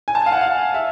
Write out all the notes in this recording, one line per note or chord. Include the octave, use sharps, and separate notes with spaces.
G#5
A5
F5
F#5
F5
E5